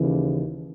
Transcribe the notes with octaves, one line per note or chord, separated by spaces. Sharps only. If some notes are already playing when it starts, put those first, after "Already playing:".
Already playing: D#2 C#3 E3